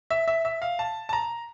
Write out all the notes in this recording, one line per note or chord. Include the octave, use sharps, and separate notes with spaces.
E5
E5
E5
F5
A5
A5
A#5